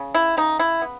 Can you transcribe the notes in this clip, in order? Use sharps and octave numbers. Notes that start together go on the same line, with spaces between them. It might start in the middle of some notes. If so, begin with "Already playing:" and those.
Already playing: C#3
E4
C#3 D#4
E4
B3